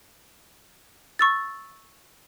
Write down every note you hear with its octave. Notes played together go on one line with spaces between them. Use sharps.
C#6 E6 A6